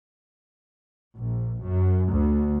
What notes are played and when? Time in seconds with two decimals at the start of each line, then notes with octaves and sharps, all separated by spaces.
1.17 A#1
1.62 F#2
2.09 D2